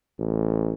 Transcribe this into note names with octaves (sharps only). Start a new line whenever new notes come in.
A1